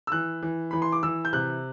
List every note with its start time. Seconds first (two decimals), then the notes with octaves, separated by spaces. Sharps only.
0.07 E6
0.12 E3 F#6
0.42 E3
0.71 E3 B5
0.82 C6
0.92 D6
1.03 E3 E6
1.25 G6
1.33 C3 F#6